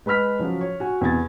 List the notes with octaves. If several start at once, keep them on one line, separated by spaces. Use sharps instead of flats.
G#3 B4 B5 F6 B6
C#3 F3 F#3
C#5
F#4 G#5
E2 C3 G#6 A6